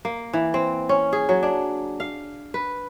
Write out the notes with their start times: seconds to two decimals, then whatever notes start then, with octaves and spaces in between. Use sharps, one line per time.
0.05 A#3
0.33 E3
0.54 C4
0.89 C#4
1.13 G#4
1.29 F#3
1.43 D4
2.00 F5
2.54 B4